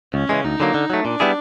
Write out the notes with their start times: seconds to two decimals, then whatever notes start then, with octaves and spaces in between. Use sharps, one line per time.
0.14 C#2 C#4
0.29 C#3 E3 G#3
0.44 D2 D#4
0.60 D3 F#3 A#3
0.74 D3
0.90 F#3 A3
1.05 A#2 D4
1.20 G3 B3 E4 G#4